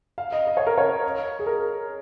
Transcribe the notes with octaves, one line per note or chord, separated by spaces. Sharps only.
F5
D#5
D#5
C#5
A#4
C#5
G#4
A#4